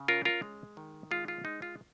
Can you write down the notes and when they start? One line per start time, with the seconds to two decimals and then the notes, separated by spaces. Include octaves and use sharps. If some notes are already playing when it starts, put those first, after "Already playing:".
Already playing: C#3
0.08 C#4 F4 A#4
0.25 F4 A#4
0.42 G#3
0.77 D#3
1.11 G#3 F4
1.28 F4
1.45 G#3 D#4
1.62 F4